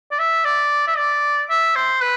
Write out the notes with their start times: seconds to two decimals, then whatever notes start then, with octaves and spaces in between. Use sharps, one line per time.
0.11 D5
0.19 E5
0.45 D5
0.87 E5
0.97 D5
1.50 E5
1.76 C5
2.01 B4